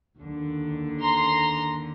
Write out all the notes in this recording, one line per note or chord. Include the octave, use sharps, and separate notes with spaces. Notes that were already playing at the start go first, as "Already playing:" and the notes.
D#2 D3
A#5 C6